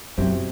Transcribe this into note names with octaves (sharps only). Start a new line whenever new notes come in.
F#2 B2 F#3 C4 E4 G4